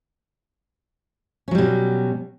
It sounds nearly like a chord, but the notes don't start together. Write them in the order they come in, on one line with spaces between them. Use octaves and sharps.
C#4 F#3 G3 B2